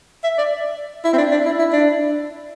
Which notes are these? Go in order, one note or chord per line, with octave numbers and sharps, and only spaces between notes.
E5
D5
E4
C4
D4
D4
E4
E4
D4